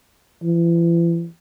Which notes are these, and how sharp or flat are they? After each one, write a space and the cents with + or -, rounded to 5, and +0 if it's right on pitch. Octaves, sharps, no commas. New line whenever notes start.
E3 +40